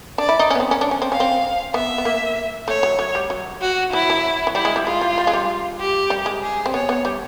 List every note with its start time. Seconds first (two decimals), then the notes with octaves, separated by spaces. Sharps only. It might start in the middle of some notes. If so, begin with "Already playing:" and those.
0.18 D4 D5
0.29 E4
0.39 D#4
0.50 C#4
0.55 B3
0.60 C4
0.71 C#4
0.81 D4
0.91 C#4
1.02 C4
1.12 C#4 F5
1.20 C4
1.74 B3 E5
1.98 B3
2.05 A#3
2.68 A3 C#5
2.83 F#3
2.99 F#3
3.15 G3
3.30 F#3
3.61 F#4
3.93 F#3 E4
4.10 F#3
4.47 F#3
4.55 G3 E4
4.65 G#3
4.76 G3
4.86 G#3 F4
5.01 G3
5.18 G3
5.27 G#3
5.33 G3
5.80 G4
6.10 G3
6.26 G#3
6.42 G#4
6.66 C4
6.73 B3 C#5
6.89 B3
7.05 G3